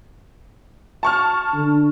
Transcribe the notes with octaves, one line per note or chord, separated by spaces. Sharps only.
A5 C#6 F6
D3